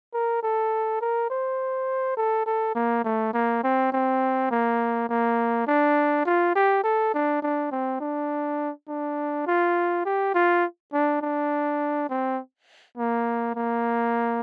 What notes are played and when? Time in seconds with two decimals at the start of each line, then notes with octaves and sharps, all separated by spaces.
0.13 A#4
0.43 A4
1.01 A#4
1.30 C5
2.17 A4
2.46 A4
2.75 A#3
3.04 A3
3.33 A#3
3.63 C4
3.92 C4
4.51 A#3
5.09 A#3
5.67 D4
6.25 F4
6.55 G4
6.83 A4
7.14 D4
7.42 D4
7.71 C4
8.00 D4
8.88 D4
9.47 F4
10.05 G4
10.34 F4
10.93 D4
11.21 D4
12.09 C4
12.97 A#3
13.55 A#3